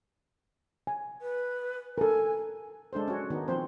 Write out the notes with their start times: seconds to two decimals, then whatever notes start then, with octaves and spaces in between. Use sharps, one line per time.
0.87 G#5
1.22 B4
1.98 A4 A#4 G#5
2.93 G#3 D4 A4 C5
3.08 C#4 F#4
3.30 D#3 B3 D#4
3.48 F3 C4 C5